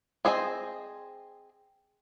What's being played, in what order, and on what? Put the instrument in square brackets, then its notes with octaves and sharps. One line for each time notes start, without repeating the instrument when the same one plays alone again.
[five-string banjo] C4 G#4 C5 D#5